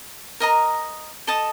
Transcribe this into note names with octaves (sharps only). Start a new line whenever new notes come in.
A#4 D#5 A#5
A4 D#5 A5